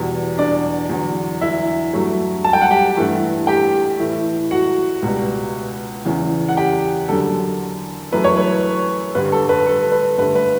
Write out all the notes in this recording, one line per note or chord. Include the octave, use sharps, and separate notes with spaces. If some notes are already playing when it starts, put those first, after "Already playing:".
Already playing: E2 B2 G3
D4 D5
E2 D3 F#3
E4 E5
G2 F#3 A3
A5
G5
F#5
G4 G5
G2 E3 A3
G4 G5
A2 E3 A3
F#4 F#5
C#2 B2 G3
E2 C#3 E3
F#5
G4 G5
F#2 D3 G3 A4
F#2 E3 A3 B4
C#5
B4
G2 D3 G3 B4
A4
B4
A4
B4
G2 D3 A3 B4
B4